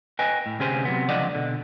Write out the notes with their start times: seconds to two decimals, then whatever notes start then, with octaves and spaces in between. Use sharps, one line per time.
0.19 B4 D#5 G5 G#5
0.46 A2
0.59 D2 C3 C#4 G4 G#4 C5
0.85 C3 F#3 B3
1.08 C#2 D3 F3 D5 D#5 F#5
1.35 B2 D3